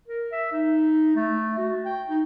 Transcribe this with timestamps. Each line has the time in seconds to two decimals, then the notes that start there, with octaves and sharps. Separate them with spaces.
0.08 A#4
0.32 E5
0.52 D#4
1.16 A3
1.58 F#4
1.85 G5
2.09 D#4